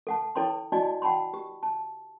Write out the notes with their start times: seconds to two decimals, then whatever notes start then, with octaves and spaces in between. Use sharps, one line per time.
0.07 A4 F#5 A5
0.35 E4 A4 C#5 G5 A#5 C6
0.72 E4 F#4 D5 D#5 G#5 A5
1.02 F#5 G5 A5 B5 C6
1.34 G4
1.63 A5